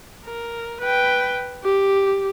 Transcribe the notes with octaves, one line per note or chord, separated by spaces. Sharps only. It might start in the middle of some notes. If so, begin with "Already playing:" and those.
A#4
B4 G5
G4